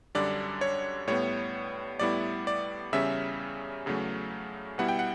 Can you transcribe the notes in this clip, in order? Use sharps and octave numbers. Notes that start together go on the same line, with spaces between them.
F#2 D3 G3 D4 D5
C#5
A2 G3 B3 C#5
A2 G3 B3 E4 D5
D5
E2 C#3 G3 C#4 E5
E2 C#3 F#3 A3
B2 G3 B3 E4 F#5
G5
F#5